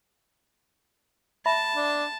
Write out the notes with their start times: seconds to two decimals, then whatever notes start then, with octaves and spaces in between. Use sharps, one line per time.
1.46 E5 A5 B5
1.76 D4